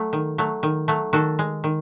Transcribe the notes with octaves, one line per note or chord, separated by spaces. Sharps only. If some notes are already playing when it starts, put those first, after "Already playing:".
Already playing: F#3 A3
D#3
F#3 A3
D#3
F#3 A3
D#3 F#4 A4
G#3
D#3